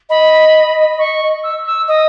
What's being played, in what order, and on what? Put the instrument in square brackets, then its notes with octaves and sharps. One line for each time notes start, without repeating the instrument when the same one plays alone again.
[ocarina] D#5 [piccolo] B5
[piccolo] C#6
E6
E6
[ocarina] D#5 [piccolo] D#6